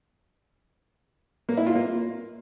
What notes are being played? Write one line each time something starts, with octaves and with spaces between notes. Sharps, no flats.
A#3
E4
F4
A#3